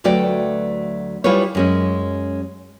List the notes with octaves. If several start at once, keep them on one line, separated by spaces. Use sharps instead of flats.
D2 F#3 A3 B4 D5 G5
G3 E4 F4 G#4 B4 C#5
F#2 G#3 C#4